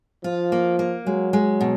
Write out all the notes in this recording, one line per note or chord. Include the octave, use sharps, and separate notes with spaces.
F3 F4
A#3
A#3
F#3 G#3
G#3
B2